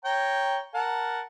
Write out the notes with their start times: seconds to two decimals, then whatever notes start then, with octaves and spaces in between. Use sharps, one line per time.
0.05 C#5 G5 A#5
0.74 A#4 F#5 A5